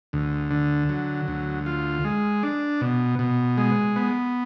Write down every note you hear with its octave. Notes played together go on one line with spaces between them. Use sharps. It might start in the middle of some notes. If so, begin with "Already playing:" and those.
D2
D3
F#3
D2
F4
G#3
D4
B2
B2
G#3
B3